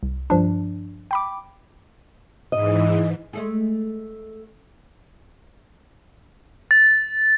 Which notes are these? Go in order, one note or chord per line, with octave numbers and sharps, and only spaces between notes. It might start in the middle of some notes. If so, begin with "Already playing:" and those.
C2
G2 F3 D4
G5 B5 D6
G#2 E3 D#5
G#3 A3 G#4
A6